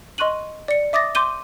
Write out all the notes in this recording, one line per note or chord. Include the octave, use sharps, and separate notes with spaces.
D#5 C6 C#6 F#6 D#7 F#7
D5 C#7
E5 D6 D#6 A6 A#6
C6 D6 G6 D#7 G7